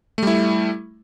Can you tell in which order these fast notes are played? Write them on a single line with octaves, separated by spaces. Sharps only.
A3 G3 E4